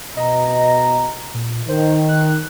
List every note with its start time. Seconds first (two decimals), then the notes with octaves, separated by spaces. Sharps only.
0.17 B2 D#5 A#5
1.34 A#2
1.69 D#3 C5
2.09 F#6